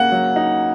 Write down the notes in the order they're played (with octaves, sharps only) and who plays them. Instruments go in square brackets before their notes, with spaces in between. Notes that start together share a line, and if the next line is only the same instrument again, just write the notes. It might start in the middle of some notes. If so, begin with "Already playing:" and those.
Already playing: [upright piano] C#3 A#3 [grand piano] F#5
[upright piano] F#3
D#4